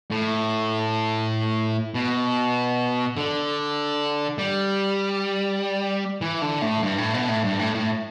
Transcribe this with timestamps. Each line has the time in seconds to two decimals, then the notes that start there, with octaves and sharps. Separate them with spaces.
0.11 A2
1.95 B2
3.17 D3
4.38 G3
6.21 E3
6.42 D3
6.62 A2
6.82 G2
6.98 A2
7.14 B2
7.29 A2
7.44 G2
7.59 A2
7.74 A2